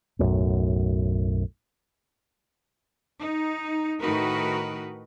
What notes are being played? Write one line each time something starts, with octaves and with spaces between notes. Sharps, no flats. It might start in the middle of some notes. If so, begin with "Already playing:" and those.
B1 F#2 A2
D#4
A2 D#3 D#4 F#4 A#4 B4